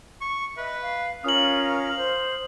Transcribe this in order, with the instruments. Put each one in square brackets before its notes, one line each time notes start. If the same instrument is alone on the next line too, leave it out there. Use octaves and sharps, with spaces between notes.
[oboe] C#6
[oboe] B4 [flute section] D#5 E5
[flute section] F5
[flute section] C#4 F4 A#4 [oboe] F5 [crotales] D#6 F#7
[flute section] C5